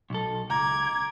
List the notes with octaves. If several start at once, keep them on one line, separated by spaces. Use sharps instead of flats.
B1 A4
C#2 A#5 D6 G#6